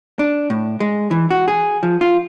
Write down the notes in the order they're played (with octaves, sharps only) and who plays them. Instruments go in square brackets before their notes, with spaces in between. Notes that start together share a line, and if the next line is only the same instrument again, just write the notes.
[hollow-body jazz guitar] D4
A2
G#3
E3
F#4
G#4
F3
F4